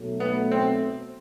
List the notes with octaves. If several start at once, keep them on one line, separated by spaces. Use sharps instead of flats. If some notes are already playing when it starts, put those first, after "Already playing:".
Already playing: B1 B2 F#3 A3
B3
C4